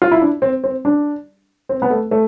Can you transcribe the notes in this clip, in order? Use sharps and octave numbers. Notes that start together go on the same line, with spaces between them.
F4
E4
D4
C4
C4
D4
C4
B3
A3
A3